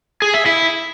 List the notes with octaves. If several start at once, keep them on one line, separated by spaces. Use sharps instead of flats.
G#4
E5
E4